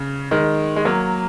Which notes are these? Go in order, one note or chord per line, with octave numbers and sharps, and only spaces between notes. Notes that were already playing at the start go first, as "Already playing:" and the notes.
Already playing: C#3
D#3 G#3
G#3
F#3 A#3